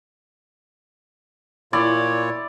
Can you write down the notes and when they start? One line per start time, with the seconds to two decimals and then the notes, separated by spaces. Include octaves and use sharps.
1.73 A#2 E4 C#5 D5